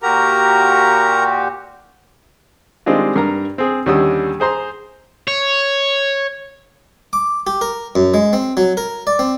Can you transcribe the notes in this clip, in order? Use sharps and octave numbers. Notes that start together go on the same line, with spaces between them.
A#2 F#4 G4 A#4 A#5
D#3 G3 G#3 C4 D4 F4
G2 A#4 A#5
C4 G#4
D#2 D3 G3 C#4 D#6 E6
G#4 C5 A#5 C6
C#5
D6
G4
A#4
F#2
G#3
C4
F#3
A#4
D5
C4